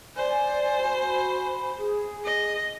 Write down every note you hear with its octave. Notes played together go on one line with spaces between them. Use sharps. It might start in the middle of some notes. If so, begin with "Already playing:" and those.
C5 D5 G#5
F#4 G#5 B5
G#4
D#5